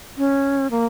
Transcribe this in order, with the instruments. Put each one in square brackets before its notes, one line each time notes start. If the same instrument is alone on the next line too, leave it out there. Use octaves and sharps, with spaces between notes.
[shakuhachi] C#4
A#3